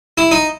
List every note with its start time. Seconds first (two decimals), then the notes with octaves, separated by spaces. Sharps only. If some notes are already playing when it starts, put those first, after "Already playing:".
0.18 E4
0.31 D#4